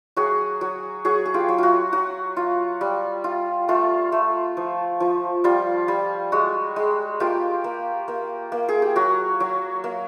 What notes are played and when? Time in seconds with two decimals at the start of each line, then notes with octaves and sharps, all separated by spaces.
0.17 F#3 F#4 G#4
0.61 F#3
1.05 F#3 F#4 G#4
1.26 G#4
1.34 F4 G4
1.49 F#3
1.58 F4 F#4
1.93 F#3 F#4
2.37 F4
2.81 G3
3.24 F4
3.68 A3 F4
4.12 A3
4.57 F3
5.00 F3
5.44 G3 F4
5.88 G3
6.32 G#3 F#4
6.76 G#3
7.20 A#3 F4 G4
7.64 A#3
8.08 A#3
8.52 A#3
8.69 G#4
8.82 G4
8.96 F#3 F#4
9.40 F#3
9.84 A#3